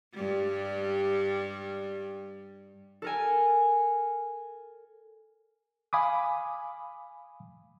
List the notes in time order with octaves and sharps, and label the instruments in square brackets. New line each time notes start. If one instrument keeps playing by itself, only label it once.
[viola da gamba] G2 G3
[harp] A4 A#4 G#5
[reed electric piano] F5 G#5 B5 D6 D#6